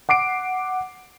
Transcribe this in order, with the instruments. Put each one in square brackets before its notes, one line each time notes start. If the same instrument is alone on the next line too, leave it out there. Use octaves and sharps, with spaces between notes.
[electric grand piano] F#5 D6 C7 D7